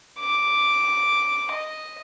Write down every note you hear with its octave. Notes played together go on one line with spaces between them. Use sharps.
D6
D#5